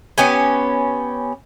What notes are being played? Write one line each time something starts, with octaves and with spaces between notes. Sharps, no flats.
B3 C#4 G4 G#5